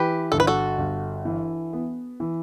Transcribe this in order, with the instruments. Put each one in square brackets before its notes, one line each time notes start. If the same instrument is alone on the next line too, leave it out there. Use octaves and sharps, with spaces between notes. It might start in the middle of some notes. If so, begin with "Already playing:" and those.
Already playing: [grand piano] E3 [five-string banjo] G4 B4
[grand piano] G1 [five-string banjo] A4
[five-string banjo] B4
F#4 A4
[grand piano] G1
E3
B3
E3